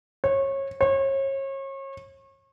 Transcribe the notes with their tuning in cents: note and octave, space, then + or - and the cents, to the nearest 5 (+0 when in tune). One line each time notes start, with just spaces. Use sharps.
C#5 -25
C#5 -35